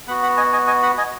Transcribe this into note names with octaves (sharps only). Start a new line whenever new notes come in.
B3 F#4 F#5 B5
F#5 B5
D#5 G#5
D#5 G#5
D#5 G#5
F#5 B5
D#5 G#5